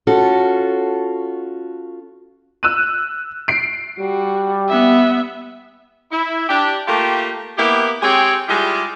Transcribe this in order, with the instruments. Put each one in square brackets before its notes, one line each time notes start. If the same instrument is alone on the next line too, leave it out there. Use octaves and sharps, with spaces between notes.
[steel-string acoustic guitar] C#4 F4 F#4 A4
[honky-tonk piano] E6 F#6 D#7
C7 D7
[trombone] G3 [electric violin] F#4
[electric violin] B3 E5
[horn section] E4
D4 G4
A3 A#3 F4 G4
A#3 B3 E4 G4
G#3 C4 G4 G#4 C#5 G5
G3 G#3 E4 F4 G4